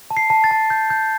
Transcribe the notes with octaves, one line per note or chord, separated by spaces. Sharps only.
A5
C7
A5
A6
A5
G6
G6